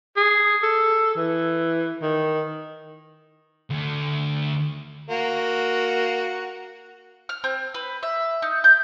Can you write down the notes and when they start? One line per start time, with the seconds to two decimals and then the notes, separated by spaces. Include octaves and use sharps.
0.17 G#4
0.63 A4
1.16 E3
2.02 D#3
3.71 D2 A3
5.10 A#3 F#4
7.29 F6
7.44 C4
7.74 B4
8.03 E5
8.42 D#4
8.64 G6